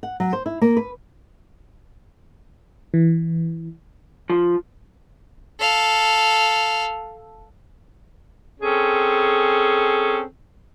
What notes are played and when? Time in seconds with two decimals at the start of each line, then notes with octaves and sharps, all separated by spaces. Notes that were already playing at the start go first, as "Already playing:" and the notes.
0.03 F#5
0.20 F#3
0.33 C5
0.46 E4
0.61 A#3
0.77 B4
2.94 E3
4.30 F3
5.60 A4 F5
8.60 C4 C#4 G#4 A4